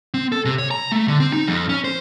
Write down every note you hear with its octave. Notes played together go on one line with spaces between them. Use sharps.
C4
A4
C3
C#5
A#5
A3
D3
C4
D#4
F2
C#4
C5